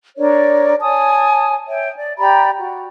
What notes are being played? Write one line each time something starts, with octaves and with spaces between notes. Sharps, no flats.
D4 A#4 C#5 D5
C#5 G#5 A5 D#6
C#5 E5 G5
D5
G4 D5 A#5 B5
F#4